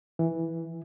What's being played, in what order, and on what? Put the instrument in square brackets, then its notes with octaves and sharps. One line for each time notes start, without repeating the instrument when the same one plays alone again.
[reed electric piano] E3